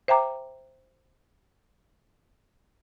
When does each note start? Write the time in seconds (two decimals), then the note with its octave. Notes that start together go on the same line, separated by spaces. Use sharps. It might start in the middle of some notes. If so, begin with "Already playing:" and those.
0.08 C5 E5 G5 A#5 D6